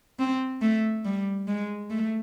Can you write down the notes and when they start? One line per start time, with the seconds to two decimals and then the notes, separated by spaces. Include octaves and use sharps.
0.19 C4
0.62 A3
1.05 G3
1.48 G#3
1.90 A3